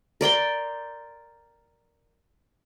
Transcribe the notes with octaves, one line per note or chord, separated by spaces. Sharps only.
A#4 D5 G5 C6